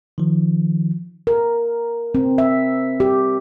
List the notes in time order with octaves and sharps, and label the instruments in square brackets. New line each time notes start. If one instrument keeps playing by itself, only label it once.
[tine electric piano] D#3 F3
[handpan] A#4
C4
E5
G4